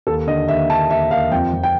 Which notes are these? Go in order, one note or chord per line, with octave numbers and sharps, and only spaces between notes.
D#2 A4
D3 D#5
D#2 E5
D3 A5
D#2 E5
D#2 F5
F2 G5
F2
G5